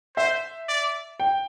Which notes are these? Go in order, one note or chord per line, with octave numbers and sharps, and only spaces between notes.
C5 E5
D5
G5